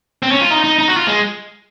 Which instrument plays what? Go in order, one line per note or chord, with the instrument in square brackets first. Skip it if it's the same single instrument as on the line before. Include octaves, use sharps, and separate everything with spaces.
[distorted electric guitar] C4
C#4
F4
D#4
D#4
D#4
F#4
F4
G#3